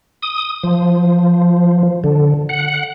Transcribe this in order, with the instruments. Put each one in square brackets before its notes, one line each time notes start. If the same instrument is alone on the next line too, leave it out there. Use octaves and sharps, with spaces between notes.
[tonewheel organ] D#6
F3
D3
F#5